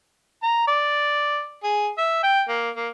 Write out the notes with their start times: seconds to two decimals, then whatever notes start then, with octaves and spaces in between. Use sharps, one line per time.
0.43 A#5
0.68 D5
1.63 G#4
1.98 E5
2.24 G5
2.48 A#3
2.75 A#3